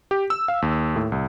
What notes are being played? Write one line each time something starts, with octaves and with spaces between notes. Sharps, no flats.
G4
E6
F5
D#2
A2
C2